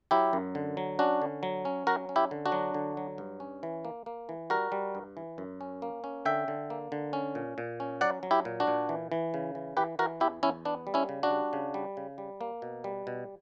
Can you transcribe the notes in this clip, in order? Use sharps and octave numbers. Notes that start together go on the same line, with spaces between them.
F#3 E4 G4
F#2
D3
F#3
C#4 D4 F#4
D3
F#3
C#4
F#3 F#4 A#4
C#4
E4 G4
D3
D4 F#4
F#3
D3
F#3
G2
C#4
E3
A#3
A#3
E3
G3 F#4 A#4
G3
G2
E3
F#2
C#4
A#3
C#4
D3 E5 G5
D3
A#3
D3
C#4
A#2
A#2
C#4
F#3 D5 F#5
F#3
E4 G4
A#2
D4 F#4
A#2
E3
E3
C#3
E3
E3 G4 B4
E3 F#4 A#4
E2 E4 G4
E2 C#4 E4
B3 D4
G3
C#4 E4
C#3
D4 F#4
G3
C#3
G3
C#3
G3
A#3
B2
G3
B2